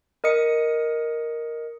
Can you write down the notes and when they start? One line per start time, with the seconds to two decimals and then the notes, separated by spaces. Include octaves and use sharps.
0.24 A#4 D#5 D#6 C#7